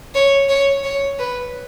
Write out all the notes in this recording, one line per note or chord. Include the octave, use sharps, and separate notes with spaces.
C#5
C#5
C#5
B4